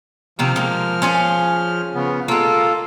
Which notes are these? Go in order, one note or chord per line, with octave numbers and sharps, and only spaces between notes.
C3 D#3 F3 A#3 F6
G#3 A#3
C#4 F4 G#4
C#3 B3
G#3 A#3 F4 A4